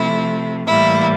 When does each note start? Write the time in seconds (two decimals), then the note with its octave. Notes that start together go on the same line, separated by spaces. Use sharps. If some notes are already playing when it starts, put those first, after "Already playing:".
Already playing: C3 F3 A3 E4
0.67 A2 E3 G3 A#3 E4